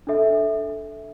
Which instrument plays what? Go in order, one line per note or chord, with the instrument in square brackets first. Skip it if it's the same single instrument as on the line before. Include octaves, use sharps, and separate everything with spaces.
[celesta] D4 A4 E5